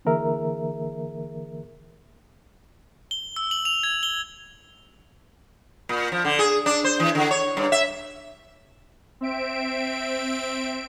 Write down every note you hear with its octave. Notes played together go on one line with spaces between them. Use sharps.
D3 E3 A#3 G#4 A#4 E5
G7
E6
F#7
F7
G#6
G7
A#2
F3
D3
G#4
D4
C5
E3
D3
C#5
G2
E5
C4 E5 D7